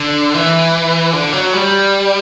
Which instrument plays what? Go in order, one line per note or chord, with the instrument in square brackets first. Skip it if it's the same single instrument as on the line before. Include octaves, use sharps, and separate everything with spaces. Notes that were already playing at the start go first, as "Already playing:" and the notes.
Already playing: [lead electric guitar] D3
E3
D3
F#3
G3